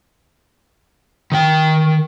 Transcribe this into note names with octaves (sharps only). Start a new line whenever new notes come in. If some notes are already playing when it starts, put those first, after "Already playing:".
D#3 G5